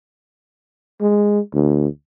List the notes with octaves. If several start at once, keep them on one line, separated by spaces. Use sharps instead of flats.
G#3
D2